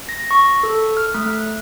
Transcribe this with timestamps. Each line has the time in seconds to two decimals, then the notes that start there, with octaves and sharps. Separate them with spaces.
0.09 A#6
0.31 C#6
0.63 A4
0.97 F6
1.14 A3